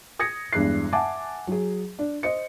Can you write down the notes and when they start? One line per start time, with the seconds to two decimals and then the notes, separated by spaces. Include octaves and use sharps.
0.19 D#6 G#6 A#6 C#7
0.53 E2 G2 G#3 F#6 C7
0.93 E5 F#5 G#5 A5 D6
1.47 F#3 G#4
1.99 D4
2.23 C5 D#5 C#7